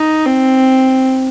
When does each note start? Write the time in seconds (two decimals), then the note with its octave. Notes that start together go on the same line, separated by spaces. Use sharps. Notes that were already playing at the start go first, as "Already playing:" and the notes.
Already playing: D#4
0.25 C4